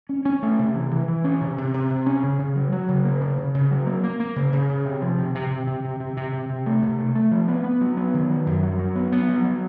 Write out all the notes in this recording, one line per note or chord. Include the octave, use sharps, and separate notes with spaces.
C#4
C#4
A3
C3
E3
E3
E3
C#4
C3
C3
C3
C3
C#4
C#3
C#3
F#3
F#3
C#3
A#3
C#3
C#3
C#3
F#3
A#3
A#3
A#3
C#3
C#3
C#3
C3
F3
C3
C3
C3
C3
C3
C3
C3
C3
C3
A3
C3
A3
A3
F3
B3
B3
F#3
B3
D#3
F#3
F#2
F#3
F#3
B3
B3
F#3
F#3